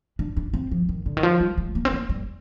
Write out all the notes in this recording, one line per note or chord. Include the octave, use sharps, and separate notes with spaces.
D4
D4
C4
F3
D#3
D3
D#3
F3
G3
G#3
A#3
C4
A#3
G3